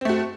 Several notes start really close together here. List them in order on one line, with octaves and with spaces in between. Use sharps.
C4 A3 F#4